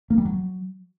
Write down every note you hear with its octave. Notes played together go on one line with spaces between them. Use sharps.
A#3
G3
F#3